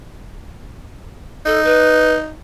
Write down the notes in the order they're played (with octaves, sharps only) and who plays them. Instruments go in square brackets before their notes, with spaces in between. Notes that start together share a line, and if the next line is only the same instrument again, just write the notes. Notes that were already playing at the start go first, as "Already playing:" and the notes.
[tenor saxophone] D#4 [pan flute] A4
[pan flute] B4